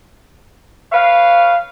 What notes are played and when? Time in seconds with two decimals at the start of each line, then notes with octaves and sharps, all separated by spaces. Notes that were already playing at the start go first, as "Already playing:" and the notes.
0.92 B4 C#5 F5